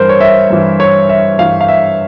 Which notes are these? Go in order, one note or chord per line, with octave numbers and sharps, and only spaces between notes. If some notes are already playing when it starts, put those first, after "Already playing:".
Already playing: G2 E3 A#4 C5
C#5
E5
G2 E3
C#5
E5
G2 E3 F5
F5
E5